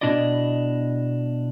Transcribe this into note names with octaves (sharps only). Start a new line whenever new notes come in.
B2 G#3 D4 E4 D5 D#5